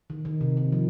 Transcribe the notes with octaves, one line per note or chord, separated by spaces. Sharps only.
D#3
D#3
C3
D#3
F3